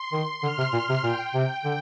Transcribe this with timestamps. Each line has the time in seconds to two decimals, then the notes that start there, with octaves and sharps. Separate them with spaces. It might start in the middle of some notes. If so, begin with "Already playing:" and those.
Already playing: C6
0.12 D#3
0.43 D3 F6
0.58 C3
0.73 A#2
0.89 C3
1.04 A#2 G5
1.34 C3
1.65 D3